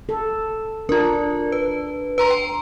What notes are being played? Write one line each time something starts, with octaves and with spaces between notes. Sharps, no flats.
A4
D4 F4 A#4
B4
B4 A#5 C6
G5